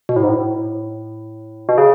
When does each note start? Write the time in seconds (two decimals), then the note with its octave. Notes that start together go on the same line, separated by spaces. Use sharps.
0.09 B2
0.16 A2
0.23 G#2
0.30 A2
1.69 B2
1.78 C#3